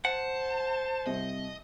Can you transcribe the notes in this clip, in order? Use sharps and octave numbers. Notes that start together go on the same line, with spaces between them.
C5 F#5 A5
C2 D#5